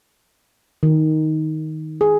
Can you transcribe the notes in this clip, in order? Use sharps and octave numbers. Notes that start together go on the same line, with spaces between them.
D#3
G#4